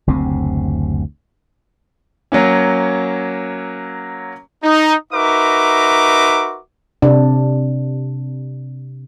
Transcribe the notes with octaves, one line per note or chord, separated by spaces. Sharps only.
F#1 D2 C3 C4
F#3 A#3 C#4
D#4
D#4 F#4 A#4 B4 E5 D6
C3 D4